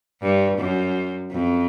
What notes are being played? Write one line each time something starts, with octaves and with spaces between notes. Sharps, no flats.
G2
F#2
F2